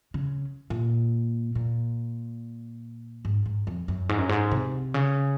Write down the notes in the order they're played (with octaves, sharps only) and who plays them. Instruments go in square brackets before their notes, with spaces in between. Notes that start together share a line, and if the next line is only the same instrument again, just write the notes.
[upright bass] C#3
A#2
A#2
G#2
G#2
F2
F#2
G#2
F#2
G#2
C3
C#3